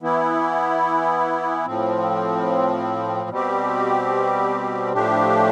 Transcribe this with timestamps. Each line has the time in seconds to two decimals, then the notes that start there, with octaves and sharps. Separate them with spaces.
0.02 E3 B3 E4
1.65 A2 F3 C4
3.29 B2 G3 C4 G4
4.93 A2 F3 A3 D4 G4